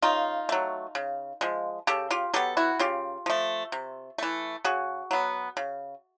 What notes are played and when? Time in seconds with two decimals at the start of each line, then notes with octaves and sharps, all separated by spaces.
0.02 C#3 D#4 F4
0.49 F#3 A3
0.95 C#3
1.41 F3 G#3
1.87 C#3 G4 A4
2.11 F4 G4
2.34 F#3 B3 G4 A4
2.57 E4 F#4
2.79 C#3 F4 G4
3.26 F3 A3
3.72 C3
4.18 E3 A3
4.64 C#3 F#4 G#4
5.11 F#3 B3
5.57 C#3